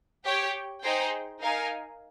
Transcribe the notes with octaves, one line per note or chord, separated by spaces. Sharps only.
G4 C#5 G5
D#4 G#4 C5 G5
D#4 A#4 F5 G#5